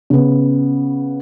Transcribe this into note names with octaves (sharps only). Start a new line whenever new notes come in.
C#3 B3